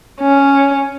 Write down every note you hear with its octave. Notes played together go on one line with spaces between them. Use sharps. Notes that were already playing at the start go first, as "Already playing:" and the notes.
C#4